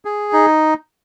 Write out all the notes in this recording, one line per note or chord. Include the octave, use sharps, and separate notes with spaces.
G#4
D#4